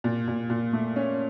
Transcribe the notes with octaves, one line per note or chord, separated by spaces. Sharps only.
A#2
A#2
A#2
A3
C#4